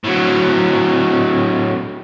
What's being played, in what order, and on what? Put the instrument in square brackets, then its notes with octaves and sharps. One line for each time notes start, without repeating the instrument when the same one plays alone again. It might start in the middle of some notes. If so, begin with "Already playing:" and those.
[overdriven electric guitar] A2 F#3